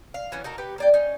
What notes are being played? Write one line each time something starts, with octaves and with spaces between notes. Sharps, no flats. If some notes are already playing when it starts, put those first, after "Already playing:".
F5
E3 F#3 B3 C#4
D#4 F#4 A4 A#4
G4 B4 F#5
A#3 D5 G5
C#4 D#4